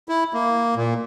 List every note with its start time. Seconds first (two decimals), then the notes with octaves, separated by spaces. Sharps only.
0.09 E4
0.34 A#3
0.76 A#2